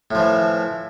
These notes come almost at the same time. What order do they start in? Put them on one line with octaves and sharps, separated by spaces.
A2 F3 E3